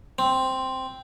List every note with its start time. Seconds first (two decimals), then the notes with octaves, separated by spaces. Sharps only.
0.19 C4